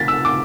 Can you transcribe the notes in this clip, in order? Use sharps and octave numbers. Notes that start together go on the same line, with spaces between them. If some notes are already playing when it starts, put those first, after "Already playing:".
Already playing: A6 B6
E6
D6